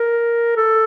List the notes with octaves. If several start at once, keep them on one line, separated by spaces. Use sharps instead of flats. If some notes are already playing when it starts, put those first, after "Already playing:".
Already playing: A#4
A4